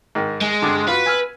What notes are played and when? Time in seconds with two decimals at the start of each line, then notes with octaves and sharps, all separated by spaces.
0.15 G#2 D#3
0.41 G#3
0.62 G2 D3 D4
0.88 F4 F#4 B4
1.06 G#5 E6 F6